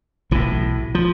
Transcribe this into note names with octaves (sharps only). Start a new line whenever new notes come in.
B1 A2 E3
F3